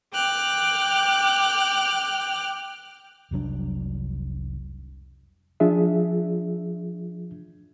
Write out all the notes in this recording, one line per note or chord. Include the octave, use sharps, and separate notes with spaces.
G5 D6 F6 F#6
F1 C2 F#3 D4
F3 D4 F4 G#4 E5